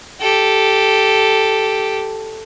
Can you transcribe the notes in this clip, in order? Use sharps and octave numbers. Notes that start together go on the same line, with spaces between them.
G4 A4